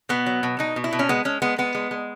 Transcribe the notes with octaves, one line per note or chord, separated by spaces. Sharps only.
B2 B3
F#3
B2
B2 D#4
B2
E4
B2
C#4
G#3 B3
G#3 C#4
G#3 B3
G#3 B3
G#3
G#3